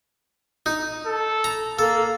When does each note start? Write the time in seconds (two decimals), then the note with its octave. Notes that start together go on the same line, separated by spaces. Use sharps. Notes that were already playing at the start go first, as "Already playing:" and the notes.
0.66 D#4
1.06 A4
1.44 A#5
1.79 A#3 A4